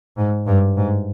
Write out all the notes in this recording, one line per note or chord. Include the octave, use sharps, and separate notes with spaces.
G#2
G2
G#2